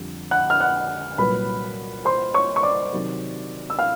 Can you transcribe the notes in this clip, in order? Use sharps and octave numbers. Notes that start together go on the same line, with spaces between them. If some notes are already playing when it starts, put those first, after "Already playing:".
Already playing: F2 D3 G3
F#5 F#6
F6
F#5 F#6
C2 A#2 F#3 B4 B5
C5 C6
C#5 C#6
C#6
D5 D6
C3 D#3 F#3
E6
F5 F6